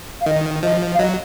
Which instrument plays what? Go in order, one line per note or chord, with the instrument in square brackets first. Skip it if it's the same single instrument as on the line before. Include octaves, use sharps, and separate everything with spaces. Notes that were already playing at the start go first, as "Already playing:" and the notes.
[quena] F5
[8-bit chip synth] D#3 [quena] D#5
[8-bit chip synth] F3 [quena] D#5
[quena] F5
[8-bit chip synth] F#3 [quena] D#5